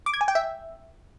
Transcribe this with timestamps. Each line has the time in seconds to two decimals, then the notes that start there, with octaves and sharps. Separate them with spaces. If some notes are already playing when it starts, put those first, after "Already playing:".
0.06 D6
0.14 G#6
0.21 G#5
0.28 G5
0.35 E5